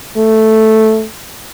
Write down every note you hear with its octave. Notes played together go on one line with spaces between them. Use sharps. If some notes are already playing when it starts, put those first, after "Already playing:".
A3